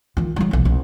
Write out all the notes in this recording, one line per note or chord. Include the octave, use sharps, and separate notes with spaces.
D#3 F4
F#3 G3
B1 E2
C2